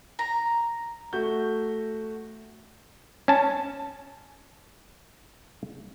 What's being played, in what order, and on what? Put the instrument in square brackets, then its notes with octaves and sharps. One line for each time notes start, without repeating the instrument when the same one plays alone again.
[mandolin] A#5
[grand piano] A3 F#4 G6
[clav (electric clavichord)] C#4 A5